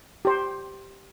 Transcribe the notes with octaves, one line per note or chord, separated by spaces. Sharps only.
G4 C5